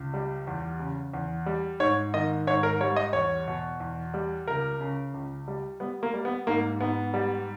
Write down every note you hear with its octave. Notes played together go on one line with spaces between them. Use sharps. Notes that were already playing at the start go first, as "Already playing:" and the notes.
Already playing: C#2
G3
E2
C#3
E2
G3
G#2 C#5
D#3 D#5
G#2 C#5
A#4
G3 C#5
D#5
E2 C#5
B2
E2
G3
C#2 A#4
C#3
C#2
G3
G3 B3
A#3
G3
B3
G#2 A#3
G#2 B3
G3